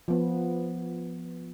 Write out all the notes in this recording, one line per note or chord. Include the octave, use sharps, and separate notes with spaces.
F3 B3